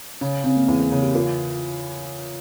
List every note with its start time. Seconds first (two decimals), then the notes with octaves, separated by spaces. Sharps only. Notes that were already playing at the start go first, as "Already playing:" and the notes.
0.21 C#3 C#4
0.44 C#3 C4
0.57 A#3
0.68 E2 G#4
0.80 A#4
0.91 C#3 G#4
1.03 G4
1.15 A#3 F4